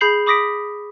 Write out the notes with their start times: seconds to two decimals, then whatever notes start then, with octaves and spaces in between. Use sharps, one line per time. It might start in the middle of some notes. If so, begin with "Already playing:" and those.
0.01 G#4 B5 G6 C7 F#7
0.27 B5 D6 D#6 A#6 B6 D7